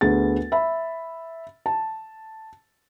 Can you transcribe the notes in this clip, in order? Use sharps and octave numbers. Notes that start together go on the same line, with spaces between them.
D2 B3 G#4 B4 A6
E5 B5
A5